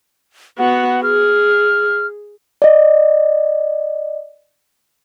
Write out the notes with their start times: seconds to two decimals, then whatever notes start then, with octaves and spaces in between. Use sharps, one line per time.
0.59 B3 F#4 F#5
1.03 G#4 F6
2.62 D5 D#5